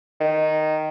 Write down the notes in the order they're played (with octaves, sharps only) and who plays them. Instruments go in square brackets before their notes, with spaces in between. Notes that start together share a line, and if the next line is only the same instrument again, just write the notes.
[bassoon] D#3